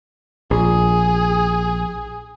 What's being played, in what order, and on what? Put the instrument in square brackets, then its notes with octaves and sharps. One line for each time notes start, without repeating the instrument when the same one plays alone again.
[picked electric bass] A#1 [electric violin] G#4